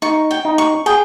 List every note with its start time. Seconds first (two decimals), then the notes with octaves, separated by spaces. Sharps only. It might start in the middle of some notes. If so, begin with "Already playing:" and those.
0.02 D#4 C#6
0.31 G5
0.45 D#4
0.58 C#6
0.86 G#4 G5